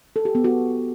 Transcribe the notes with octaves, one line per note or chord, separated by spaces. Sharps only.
A4
G4
B3
F#4